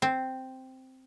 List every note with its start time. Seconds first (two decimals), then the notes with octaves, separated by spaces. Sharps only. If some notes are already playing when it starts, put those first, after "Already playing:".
0.02 C4